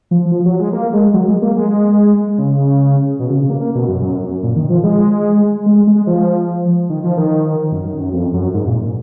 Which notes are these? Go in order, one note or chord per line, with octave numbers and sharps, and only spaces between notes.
F3
F3
F#3
G#3
A#3
G#3
F#3
G#3
A#3
G#3
C#3
B2
C#3
C#3
A#3
A#3
B2
F#2
F#2
F#2
A#2
D#3
F3
G#3
G#3
G#3
F3
D#3
F3
D#3
F#2
F#2
F#2
F2
F#2
G#2
A#2